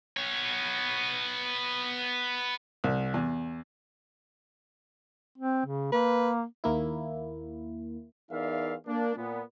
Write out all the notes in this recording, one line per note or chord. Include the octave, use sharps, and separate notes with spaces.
B3 C#5
C2
E2
C4
C#3
A#3 B4
D#2 A#3 E4
E2 D#4 A#4 D5 E5 F5
A#3 D4
A#2 B3